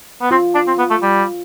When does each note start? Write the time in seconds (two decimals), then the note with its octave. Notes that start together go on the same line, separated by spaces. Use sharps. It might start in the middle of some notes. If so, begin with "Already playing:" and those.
0.22 B3
0.31 C4 F4
0.55 D4
0.67 C4
0.79 B3
0.90 A3
1.02 G3